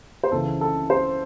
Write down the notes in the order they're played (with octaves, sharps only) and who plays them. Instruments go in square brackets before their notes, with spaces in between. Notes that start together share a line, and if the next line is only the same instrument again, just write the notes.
[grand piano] C5
C#2 C#3 E3 A4
A4
C5